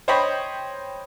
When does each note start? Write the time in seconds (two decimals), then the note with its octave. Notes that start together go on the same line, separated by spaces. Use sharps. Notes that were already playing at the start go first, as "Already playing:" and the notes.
0.08 C5 C#5 D#5 G5 B5